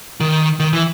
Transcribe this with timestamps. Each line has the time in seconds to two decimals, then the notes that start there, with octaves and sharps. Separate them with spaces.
0.20 D#3
0.60 D#3
0.73 E3